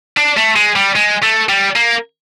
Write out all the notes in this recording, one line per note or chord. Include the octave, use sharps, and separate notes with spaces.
D4
A3
G#3
G3
G#3
A3
G3
A#3